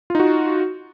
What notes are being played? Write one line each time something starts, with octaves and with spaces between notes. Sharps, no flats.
D#4 F4 F#4